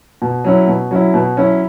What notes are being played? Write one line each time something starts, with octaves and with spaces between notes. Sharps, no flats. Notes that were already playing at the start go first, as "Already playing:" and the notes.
B2
F#3 C#4 E4
B2
F#3 C#4 E4
B2
F#3 C#4 E4